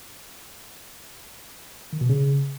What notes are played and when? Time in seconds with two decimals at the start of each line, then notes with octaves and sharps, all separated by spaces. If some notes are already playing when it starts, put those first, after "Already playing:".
1.93 D#3
2.01 B2
2.09 C#3